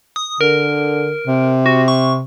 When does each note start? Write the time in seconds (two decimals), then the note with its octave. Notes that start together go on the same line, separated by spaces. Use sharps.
0.16 D#6
0.41 D3 A#4
1.27 C3
1.66 F#4
1.88 C#6